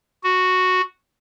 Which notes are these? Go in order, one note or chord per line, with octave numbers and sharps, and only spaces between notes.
F#4